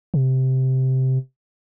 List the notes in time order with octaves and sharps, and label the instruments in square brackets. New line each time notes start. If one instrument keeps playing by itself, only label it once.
[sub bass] C3